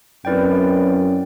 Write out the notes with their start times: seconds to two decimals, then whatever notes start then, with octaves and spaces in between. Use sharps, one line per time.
0.25 F#2 C4 E4 B4 D5 G5